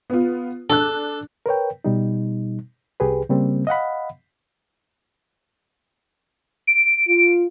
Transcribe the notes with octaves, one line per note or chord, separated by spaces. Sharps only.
B3 F4
D4 A4 F#6
A#4 B4 C#5 G5
B2 G3 D#4
C2 G4 G#4 B4
C#3 G3 A#3 C4
D#5 F5 F#5 B5
D7
F4